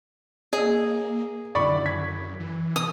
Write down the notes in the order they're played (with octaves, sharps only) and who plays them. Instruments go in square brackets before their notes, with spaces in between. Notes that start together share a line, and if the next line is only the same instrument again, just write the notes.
[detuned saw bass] A#3 [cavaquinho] G#4 [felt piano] D#5 E6
[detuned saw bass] F#2 [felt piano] D3 D#3 E4 [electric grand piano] D5 B5 C#6
[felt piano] G#6 [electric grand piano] B6
[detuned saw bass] E3
[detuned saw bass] C3 [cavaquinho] D#6